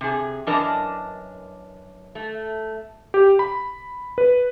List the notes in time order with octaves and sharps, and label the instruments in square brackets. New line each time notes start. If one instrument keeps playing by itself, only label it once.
[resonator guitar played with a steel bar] C3 G#4
F#2 E3 D4 A#4 D#5 A5
A3
[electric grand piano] G4
B5
B4